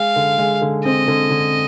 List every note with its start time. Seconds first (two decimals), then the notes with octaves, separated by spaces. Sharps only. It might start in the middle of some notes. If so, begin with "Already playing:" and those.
Already playing: G#3 F5
0.16 D3
0.39 G#3
0.62 D3
0.84 C4 D#5
1.08 D3
1.30 D3